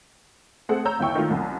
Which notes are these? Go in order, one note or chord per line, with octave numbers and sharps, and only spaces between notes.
A3 C4 G#4 A4 F#5
C#5 A#5 E6 G6
G1 D#2 E4 G5 C#6
D#3 A3 F4
C2 F#2